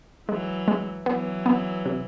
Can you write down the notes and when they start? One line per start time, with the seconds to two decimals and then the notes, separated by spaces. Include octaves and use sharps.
0.28 E3 F#3 G#3
0.68 G#3
1.06 E3 F#3 B3
1.46 B3
1.86 C3